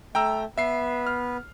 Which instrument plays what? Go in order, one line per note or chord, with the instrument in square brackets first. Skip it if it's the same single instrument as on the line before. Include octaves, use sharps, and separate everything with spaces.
[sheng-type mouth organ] A3 [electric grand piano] G5 A#5 E6
[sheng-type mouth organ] B3 B4 [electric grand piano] E5 C7
[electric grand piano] F6